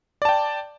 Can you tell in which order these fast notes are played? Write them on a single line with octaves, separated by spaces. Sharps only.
D5 A5 G5